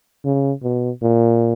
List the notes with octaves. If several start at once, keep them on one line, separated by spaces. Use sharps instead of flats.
C#3
B2
A#2